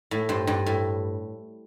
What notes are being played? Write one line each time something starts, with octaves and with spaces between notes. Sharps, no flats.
A2
G2 C5
G2
A2